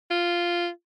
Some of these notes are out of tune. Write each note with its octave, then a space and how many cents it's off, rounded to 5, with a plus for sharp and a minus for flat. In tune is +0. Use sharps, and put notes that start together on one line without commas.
F4 -5